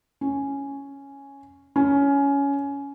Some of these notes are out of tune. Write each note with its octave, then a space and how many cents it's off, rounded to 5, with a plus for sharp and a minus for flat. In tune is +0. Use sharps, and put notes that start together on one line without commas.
C#4 +0
C#4 +15